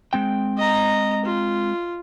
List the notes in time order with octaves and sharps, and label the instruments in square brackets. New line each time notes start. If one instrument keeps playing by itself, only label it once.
[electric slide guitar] G#3 C4 G5
[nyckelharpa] D#5 A#5
F4